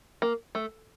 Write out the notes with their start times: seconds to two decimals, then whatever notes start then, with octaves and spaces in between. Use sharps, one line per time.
0.22 A#3
0.55 A3